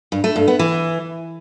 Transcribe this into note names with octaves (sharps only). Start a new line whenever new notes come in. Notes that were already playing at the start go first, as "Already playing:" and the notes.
G2
A3
G2
B3
E3